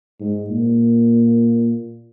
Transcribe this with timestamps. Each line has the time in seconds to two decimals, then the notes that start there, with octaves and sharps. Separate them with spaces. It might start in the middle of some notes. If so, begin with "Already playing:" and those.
0.21 G#2
0.49 A#2